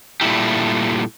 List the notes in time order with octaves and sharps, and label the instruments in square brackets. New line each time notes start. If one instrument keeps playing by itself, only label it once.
[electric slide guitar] A#2 G3 A3 E4 G4